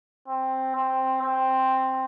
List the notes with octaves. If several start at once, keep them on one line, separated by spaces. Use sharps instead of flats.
C4
C4
C4